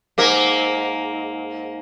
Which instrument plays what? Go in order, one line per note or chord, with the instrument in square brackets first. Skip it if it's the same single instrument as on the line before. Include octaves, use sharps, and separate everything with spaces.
[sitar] G#2 A#3 A#4